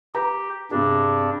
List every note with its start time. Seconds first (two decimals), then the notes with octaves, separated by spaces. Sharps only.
0.15 G4 B4 A#5
0.71 G2 C3 D4 G4 G#4